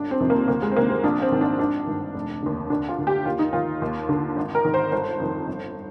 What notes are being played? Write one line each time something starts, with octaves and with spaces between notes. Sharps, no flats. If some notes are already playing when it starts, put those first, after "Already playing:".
Already playing: G1 D4
C4
F2 C3 D#3
A#3
D2 A#3
G#3
C4
C3 D#3 A#3
C4
A#1 D4
C4
G#2 D#3
D4
G#1 D4
G2 D#3
F1
D#2 D3
D2 D4
F4
D3
G4
D#2 F4
D#4
D#3 F4
D#2
D3
G#1
A#4
G#2 D#3
C5
G1 C5
F2 D#3
G1